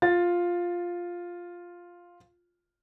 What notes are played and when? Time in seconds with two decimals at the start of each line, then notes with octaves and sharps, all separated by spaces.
0.02 F4 A6